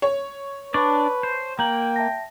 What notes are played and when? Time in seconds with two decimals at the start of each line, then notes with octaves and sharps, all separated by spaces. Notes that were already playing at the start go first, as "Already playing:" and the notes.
0.02 C#5
0.74 D4 B4 D5 A5 C#6
1.23 C5
1.59 A#3 G5 A#5 G6 F#7
1.96 E5 A5 A#6